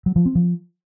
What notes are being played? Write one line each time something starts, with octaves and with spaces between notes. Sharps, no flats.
F#3
F3
C4
F3